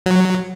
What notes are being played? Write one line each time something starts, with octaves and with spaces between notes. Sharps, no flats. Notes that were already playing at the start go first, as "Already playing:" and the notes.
F#3